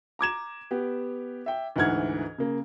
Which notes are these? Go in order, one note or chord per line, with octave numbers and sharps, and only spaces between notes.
A#5 D6 G#6 E7
B3 G4
E5 G5
D2 G#2 E3 F#5 F6 G#6
C#3 A#3